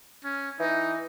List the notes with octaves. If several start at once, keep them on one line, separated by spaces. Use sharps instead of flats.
C#4
E3 D#4